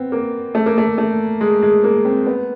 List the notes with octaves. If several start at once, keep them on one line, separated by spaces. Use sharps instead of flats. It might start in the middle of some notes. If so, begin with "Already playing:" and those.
Already playing: B3 C4
A#3
A3
A#3
A3
A3
G#3
G#3
A#3
C4
B3